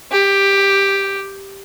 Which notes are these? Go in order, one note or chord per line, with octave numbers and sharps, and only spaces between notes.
G4